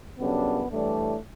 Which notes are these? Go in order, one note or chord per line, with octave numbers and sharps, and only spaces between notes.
F#2 C#3 G3 B3 D4
A2 E3 G3 A3 D4